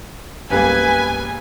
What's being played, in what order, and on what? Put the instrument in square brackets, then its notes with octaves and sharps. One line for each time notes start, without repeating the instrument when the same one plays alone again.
[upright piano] E1 G3 A#3 [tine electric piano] A#1 F#2 [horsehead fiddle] B4 [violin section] G#5